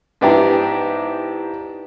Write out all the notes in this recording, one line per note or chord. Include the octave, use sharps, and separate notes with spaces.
G#2 B3 D4 E4 G4 A#5